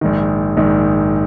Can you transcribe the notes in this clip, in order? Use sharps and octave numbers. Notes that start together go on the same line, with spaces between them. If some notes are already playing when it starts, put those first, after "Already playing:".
A#1 G#2 D#3
A#1 G#2 D#3